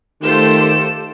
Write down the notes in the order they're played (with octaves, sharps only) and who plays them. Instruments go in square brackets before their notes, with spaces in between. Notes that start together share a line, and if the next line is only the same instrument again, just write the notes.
[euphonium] D#3 [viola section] A3 F4 C5 [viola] G4 A4 [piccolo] E7